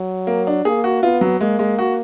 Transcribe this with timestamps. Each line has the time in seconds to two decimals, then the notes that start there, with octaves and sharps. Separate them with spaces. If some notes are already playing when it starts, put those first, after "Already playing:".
Already playing: F#3
0.27 A#3
0.47 D4
0.65 A#3 G#4
0.84 F#4
1.03 B3 F4
1.21 F#3
1.40 G#3 A#3
1.59 G#3
1.79 F#4